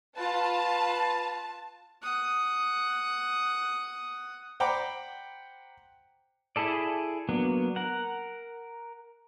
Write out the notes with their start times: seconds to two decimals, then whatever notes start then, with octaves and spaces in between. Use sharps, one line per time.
0.17 F4 B4 A5
2.02 F#5 D#6
4.60 C5 F#5 G5 A#5 B5 D6
6.56 E4 G#4 A4 D5
7.29 F#3 A#3 B3 D4
7.76 A#4 F#5